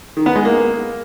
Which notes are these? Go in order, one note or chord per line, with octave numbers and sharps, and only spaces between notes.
D#3
B3
G#3
A#3